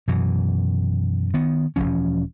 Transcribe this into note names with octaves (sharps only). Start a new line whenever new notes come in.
F#2 B2 E3
D#3 B3
E1 E2 F3 C#4